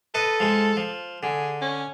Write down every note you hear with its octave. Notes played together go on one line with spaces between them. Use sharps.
A4 B4 D#5
F3 G#3
F3
D3 G#4
C#4